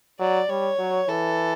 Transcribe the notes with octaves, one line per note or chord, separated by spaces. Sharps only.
F#3 D5
G3 C#5
F#3
E3 A4